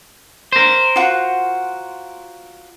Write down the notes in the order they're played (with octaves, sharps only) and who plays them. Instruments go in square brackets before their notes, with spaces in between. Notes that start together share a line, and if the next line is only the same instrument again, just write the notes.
[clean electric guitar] A#4 C5
[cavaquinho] F4 F#4 F#5